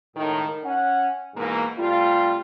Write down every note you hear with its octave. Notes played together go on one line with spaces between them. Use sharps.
C#2 A2 D#3
C#4 F#5
G#2 B2 E3 A#3
C3 G3 A3 F4